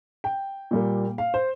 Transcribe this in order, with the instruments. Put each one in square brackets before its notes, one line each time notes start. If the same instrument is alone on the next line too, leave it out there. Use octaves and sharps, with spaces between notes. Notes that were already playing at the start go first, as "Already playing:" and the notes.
[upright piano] G5
A#2 G3 A#3
F5
C5